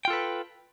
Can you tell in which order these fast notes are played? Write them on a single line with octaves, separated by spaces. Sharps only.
G5 F4 A4 B4